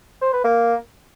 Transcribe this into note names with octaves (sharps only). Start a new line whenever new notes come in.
C5
B4
A#3